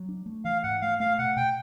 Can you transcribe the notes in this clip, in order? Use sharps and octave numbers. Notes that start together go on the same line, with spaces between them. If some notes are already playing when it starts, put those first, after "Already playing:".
Already playing: F#3
D4
A3
E3 F5
G#2 F#5
A3 F5
A3 F5
B2 F#5
B2 G5